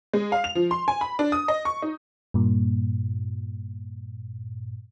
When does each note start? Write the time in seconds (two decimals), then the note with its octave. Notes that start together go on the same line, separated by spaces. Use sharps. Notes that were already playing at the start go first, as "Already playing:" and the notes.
0.13 G#3
0.32 F5
0.44 F7
0.55 F3
0.71 C6
0.88 G#5
1.01 B5
1.19 D4
1.32 D#6
1.48 D#5
1.65 C#6
1.82 D#4
2.34 G2 A#2